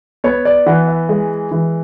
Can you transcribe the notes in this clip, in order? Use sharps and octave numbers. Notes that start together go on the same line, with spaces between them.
B3 C#5
D5
E3 F#5
E5
G#3
E3